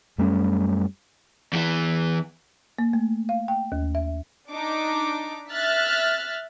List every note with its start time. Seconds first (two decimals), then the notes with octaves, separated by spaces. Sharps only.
0.18 F#2 G3 A3 C#4
1.53 E2 E3
2.79 A#3
2.93 A3
3.29 F5
3.48 G5
3.72 D#2
3.95 E5
4.51 D4 D#4 D6
5.52 E5 F6 F#6 A6 B6